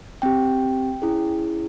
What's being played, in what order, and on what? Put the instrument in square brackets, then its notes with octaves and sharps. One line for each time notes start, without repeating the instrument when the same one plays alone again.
[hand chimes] C4 G4 G5
C#4 E4 G#4